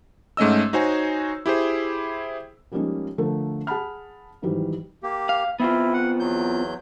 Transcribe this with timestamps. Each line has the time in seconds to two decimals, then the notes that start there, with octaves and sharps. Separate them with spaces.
0.37 G#2 A3 C#4 D#5 E6
0.73 D#4 F#4 C5 C#5 G#5
1.46 E4 G4 G#4 C5
2.72 F3 G3 G#3 A#3 C#4 D#4
3.18 D3 F3 A3 A4 A#4
3.67 G#4 F#5 A5 B5 F6
4.42 G#2 D#3 E3 F#3 G3
5.03 A#3 G4
5.29 F5
5.60 B3 C4 E4 F4
5.94 F#5
6.20 E2 F#3 G6